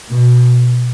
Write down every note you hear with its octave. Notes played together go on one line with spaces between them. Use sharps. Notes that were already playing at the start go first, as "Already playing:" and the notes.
B2